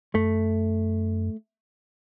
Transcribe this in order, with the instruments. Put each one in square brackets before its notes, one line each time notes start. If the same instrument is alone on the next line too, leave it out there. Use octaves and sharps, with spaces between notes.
[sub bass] F#2 [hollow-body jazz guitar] A3